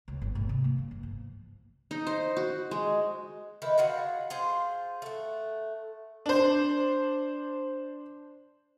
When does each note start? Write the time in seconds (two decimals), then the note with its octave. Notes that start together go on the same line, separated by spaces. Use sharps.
0.08 C#2
0.22 G1
0.35 A2
0.49 C3
0.64 A#3
0.78 C#3
0.91 G1
1.03 F3
1.91 D#4
2.07 C5
2.37 F#4
2.71 G#3
3.62 D#3 E4 B4 C5
3.78 F4 F#4 G#4 F#5
4.30 F4 G#4 C5
5.02 A3 F#5
6.26 D4 C5